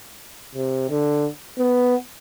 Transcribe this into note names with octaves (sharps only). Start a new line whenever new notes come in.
C3
D3
B3